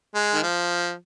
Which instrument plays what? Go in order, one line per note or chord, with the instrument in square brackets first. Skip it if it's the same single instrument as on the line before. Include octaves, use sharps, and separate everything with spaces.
[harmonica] G#3
D#3
F3